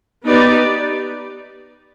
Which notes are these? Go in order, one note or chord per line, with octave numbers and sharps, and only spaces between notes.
B3 D#4 G4 B4 D5